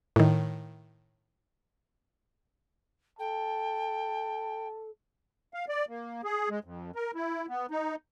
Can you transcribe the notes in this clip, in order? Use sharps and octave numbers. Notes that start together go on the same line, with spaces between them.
A2 D#3
A4 G5 A5
F5
D5
A#3
G#4
G#3
F2
A#4
E4
B3
D#4